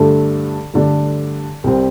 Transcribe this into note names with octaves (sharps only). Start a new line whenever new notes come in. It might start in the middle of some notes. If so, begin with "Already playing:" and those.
Already playing: G2 D3 A3 D4 A4
G2 D3 A3 D4 A4
C2 C3 G3 C4